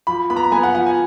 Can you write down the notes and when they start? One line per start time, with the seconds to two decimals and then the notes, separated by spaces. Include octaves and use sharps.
0.07 F3 B5
0.30 B3 B5
0.36 A#5
0.44 B5
0.52 B3 G#5
0.63 F#5
0.75 F3 F#5
0.86 G#5